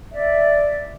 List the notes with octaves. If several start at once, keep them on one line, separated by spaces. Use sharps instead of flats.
D5 E5